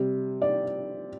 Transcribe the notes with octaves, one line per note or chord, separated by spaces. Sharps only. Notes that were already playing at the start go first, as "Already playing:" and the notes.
Already playing: C3 G3
D5